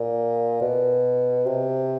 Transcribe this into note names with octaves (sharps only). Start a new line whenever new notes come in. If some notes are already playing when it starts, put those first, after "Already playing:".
Already playing: A#2
B2
C3